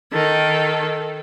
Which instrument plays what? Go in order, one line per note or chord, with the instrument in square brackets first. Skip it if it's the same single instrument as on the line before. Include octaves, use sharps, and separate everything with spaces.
[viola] D#3 A4